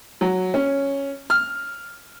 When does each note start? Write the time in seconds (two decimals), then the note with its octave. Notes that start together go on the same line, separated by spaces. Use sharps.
0.21 F#3
0.54 C#4
1.30 F6